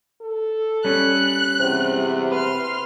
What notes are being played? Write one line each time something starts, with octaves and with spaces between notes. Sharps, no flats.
A4
G3 C#4 F#6
E2 C3
B4 C6 F6